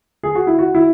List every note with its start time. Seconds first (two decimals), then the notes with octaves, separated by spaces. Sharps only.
0.23 G#4
0.35 F#4
0.47 E4
0.59 F#4
0.75 E4